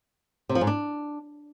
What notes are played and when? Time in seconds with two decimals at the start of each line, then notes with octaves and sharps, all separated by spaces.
0.49 C3
0.55 F3
0.61 G#2
0.67 D4